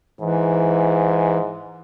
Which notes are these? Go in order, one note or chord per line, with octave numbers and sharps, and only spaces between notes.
G#2 E3